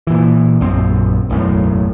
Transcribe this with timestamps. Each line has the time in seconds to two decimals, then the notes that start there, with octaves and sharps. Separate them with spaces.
0.07 A#2 E3
0.61 A#1 F#2 C4
1.29 E1 B1 F#2 A2